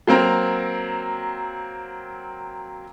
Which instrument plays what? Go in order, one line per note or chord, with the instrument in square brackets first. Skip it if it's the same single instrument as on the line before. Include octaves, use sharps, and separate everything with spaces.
[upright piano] F#3 A#3 C4 A#5